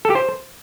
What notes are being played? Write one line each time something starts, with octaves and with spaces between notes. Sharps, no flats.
A4
G4
C5